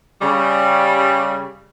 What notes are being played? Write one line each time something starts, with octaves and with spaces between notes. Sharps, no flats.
C#3 G3